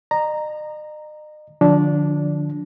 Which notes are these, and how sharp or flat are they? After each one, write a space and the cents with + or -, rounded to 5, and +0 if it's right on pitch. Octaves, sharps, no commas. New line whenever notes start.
D#5 -40 A#5 +0
D3 +25 F3 +25 D4 -10